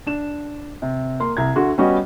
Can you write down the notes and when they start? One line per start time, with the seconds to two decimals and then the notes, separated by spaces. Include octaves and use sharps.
0.06 D4 E7
0.82 C3
1.20 A#3 C6
1.37 C2 A#5 G#6
1.56 D2 D3 F#4 C6
1.78 G3 B3 C#4 F#4 D#5